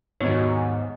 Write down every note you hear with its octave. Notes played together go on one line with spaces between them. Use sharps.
D#2 G#2 B2 F#3 D#4 C#5